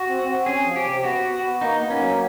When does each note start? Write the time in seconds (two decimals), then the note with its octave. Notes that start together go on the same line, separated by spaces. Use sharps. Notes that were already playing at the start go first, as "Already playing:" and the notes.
Already playing: F#4
0.08 C4
0.28 C4
0.46 C#4 G#4
0.66 F3
0.76 G4
0.84 C3
1.04 B3 F#4
1.23 B3
1.43 B3
1.61 A#3 D#4
1.81 A#3
1.90 C#4
2.00 F#3